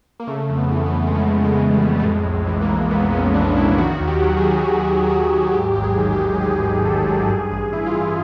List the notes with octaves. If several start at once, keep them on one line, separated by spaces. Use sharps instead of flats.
A#3
C#3 A3
F2
B3
E3
B3
F2
G#3
C#3 A3
F2
G#3
E3
G3
F2
A3
A2 G#3
B1
E3
A#3
B1
A2 B3
B1 C#4
E3 D4
B1 E4
D#3 F#4
D#2
G4
F#3
G#4
D#2
D#3
D#2
F#3 F#4
D#2
G#2 G4
A1 G4
G#4
D#3
G4
F#3
G#2 G#4
A1
D#3 A4
F#3
G2 G#4
A1 G#4
E3 E4
F4
A1 E4